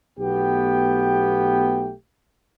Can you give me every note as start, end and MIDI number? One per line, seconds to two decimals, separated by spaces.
0.19 1.92 35
0.19 1.92 57
0.19 1.92 59
0.19 1.92 67
0.19 1.92 79